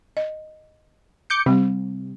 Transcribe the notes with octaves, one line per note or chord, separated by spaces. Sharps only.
D#5
D6 G6 C#7
C3 G3 C4